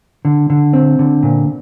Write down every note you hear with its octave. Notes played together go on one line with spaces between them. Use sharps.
D3
D3
C4
D3
A#2